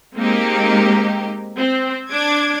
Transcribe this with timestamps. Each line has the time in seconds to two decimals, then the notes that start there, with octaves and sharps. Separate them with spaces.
0.16 G#3 A#3 C4 D#4 G4
1.58 C4
2.09 D4 D6 G#6